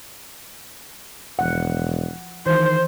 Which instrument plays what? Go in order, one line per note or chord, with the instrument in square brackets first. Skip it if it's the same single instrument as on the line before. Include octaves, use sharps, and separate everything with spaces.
[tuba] E1 [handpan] F3 F#5
[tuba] D#3 [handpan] E3 [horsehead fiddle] C5